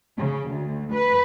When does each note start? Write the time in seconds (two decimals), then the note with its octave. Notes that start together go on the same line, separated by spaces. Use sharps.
0.16 C#3
0.50 D2
0.92 B4